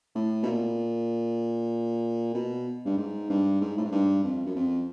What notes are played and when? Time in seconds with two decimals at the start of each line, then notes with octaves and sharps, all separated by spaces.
0.15 A2
0.43 B2
0.46 A#2
2.35 B2
2.85 G2
2.97 G#2
3.30 G2
3.61 G#2
3.77 A2
3.85 G#2
3.92 G2
4.24 F2
4.46 F#2
4.56 F2